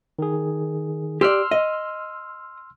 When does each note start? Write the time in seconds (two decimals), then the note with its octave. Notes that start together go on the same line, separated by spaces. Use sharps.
0.19 D#3 G#4
1.21 G4 D5 C6 E6 F6
1.51 D#5